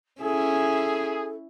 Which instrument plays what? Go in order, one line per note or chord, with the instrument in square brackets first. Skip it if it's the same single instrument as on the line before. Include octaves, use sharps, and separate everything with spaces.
[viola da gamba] C#4 E4 [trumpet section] G#4 [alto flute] A4